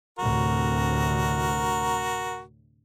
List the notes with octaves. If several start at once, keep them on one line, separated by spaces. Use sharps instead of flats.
D2 A2 C3 F#4 A#4